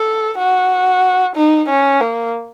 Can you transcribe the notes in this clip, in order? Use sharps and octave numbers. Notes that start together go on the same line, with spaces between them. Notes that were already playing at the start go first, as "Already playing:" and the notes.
Already playing: A4
F#4
D#4
C#4
A#3